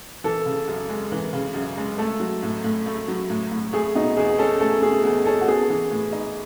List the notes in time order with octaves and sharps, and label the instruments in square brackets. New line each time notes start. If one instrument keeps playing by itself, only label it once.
[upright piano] E3 [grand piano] A4
[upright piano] C#3
F#2
G#3
E3
C#3
F#2
G#3
[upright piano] A3 [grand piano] A4
[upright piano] F#3
A2
A2
A3
F#3
A2
A2
[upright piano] A3 [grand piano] G#4
[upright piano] B2 [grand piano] D#4
[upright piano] E2 [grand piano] G#4
[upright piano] C#4 [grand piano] A4
[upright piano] A3 [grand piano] A4
[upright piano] B2 [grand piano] G#4
[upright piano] E2 [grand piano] G#4
[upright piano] C#4 [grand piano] A4
[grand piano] F#4
[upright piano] B3 [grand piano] G#4
[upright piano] E3
A2
D#4